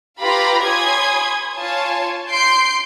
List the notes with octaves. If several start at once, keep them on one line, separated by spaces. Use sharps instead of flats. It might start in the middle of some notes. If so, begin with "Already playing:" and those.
F4 G4 B4 F5 A#5 B5
C#5 G#5 B5 C6 D#6 G#6
F4 C#5 G#5 A5
C6 G6 C7 D7